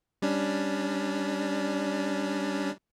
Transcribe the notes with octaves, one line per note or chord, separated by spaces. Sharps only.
G3 C#4 D4